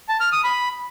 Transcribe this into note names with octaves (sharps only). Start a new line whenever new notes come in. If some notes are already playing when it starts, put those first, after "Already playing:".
A5
F6
D#6
B5